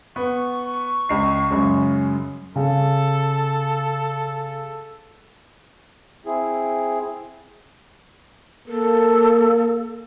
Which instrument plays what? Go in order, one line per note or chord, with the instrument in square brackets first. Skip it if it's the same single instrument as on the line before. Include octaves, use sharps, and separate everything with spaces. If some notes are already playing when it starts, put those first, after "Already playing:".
[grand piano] B3 [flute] C#6
[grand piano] C#2 C7
F#2 C#3 G#3
[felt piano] C#3 [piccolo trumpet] A4
[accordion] C4 E4 G#4
[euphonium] A#3 [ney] A4